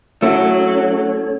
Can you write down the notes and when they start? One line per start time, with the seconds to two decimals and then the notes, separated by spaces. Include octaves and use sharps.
0.22 F#3 A3 C#4 E4 A4 C#5